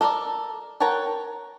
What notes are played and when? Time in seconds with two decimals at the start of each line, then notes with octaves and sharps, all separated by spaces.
0.01 A4 A#4 C5 D5
0.80 A#4 C#5 F#5 G5 A5